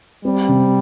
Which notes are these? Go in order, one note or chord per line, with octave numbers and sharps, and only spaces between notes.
G3 C4
C3